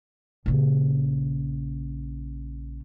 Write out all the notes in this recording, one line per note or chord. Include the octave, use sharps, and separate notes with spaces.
A#1 C#3